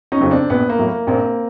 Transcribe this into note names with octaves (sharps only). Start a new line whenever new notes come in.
C#4 D#4
F2 C#3 F#3
C4 D4
A#1 B3
A#3
A2 F#3
A#3
A#1 A#3 C4